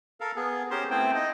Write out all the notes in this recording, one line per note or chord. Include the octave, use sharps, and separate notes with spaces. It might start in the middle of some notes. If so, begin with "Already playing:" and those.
A4 A#4 F5
B3 G#4
C#4 G4 G#4 A#4 C5 C6
A3 B3 C4 E4 C5 G5
D#4 D#5